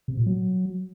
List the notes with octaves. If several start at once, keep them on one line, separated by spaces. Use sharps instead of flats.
C3
A#2
F#3